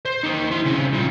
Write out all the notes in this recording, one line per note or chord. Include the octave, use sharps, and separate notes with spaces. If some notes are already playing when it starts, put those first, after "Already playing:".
C5
D#4 G4
E4 C6
C#3 C4
A#2 G3